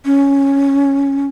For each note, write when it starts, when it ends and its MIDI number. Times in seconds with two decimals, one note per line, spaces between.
0.05 1.26 61